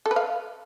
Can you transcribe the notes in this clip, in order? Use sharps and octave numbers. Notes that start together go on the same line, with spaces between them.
A4
B4
F5